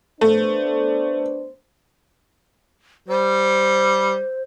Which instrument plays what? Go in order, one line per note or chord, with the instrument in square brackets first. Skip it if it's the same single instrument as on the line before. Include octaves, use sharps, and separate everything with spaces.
[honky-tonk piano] A3 [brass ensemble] B3 D4 C5
[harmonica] G3 [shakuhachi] C5